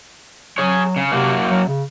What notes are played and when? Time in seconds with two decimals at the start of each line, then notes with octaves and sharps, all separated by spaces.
0.58 F#3 G#4 C#5
0.96 C#3
1.11 F#2 C3 A#3 F#4
1.50 F#3
1.68 C#3